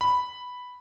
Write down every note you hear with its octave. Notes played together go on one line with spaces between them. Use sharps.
B5